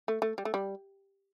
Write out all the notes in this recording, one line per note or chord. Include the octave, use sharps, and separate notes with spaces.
A3
A3
G3
A3
G3